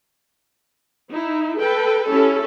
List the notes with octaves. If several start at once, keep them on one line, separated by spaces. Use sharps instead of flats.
D#4 E4
A4 B4 G5
C#4 E4 G4 A4